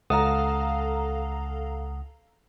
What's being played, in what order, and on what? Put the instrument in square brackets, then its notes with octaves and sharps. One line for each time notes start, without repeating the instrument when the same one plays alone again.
[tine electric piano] C#2 F#5 D#6 [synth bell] A4 F5 A#5